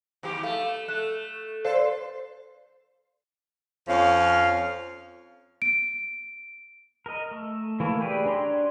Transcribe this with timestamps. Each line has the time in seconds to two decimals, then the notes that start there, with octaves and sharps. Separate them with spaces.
0.23 D#2 D#3 G4
0.43 A3 F5
0.88 A3 F#6 E7
1.65 A4 C5 D5 F5
3.88 F2 F3 C#4 F5
5.62 D7
7.06 A#4 D#5
7.31 A3
7.80 E3 A3 A#3
8.01 A3 G4 G#4 B4 D5
8.26 D4 C#5 A#5 C6